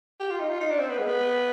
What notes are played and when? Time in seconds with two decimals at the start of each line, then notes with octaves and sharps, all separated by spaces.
0.20 G4
0.31 F4
0.40 D#4
0.50 F4
0.60 D#4
0.70 D4
0.80 C4
0.90 B3
0.99 G#3
1.07 B3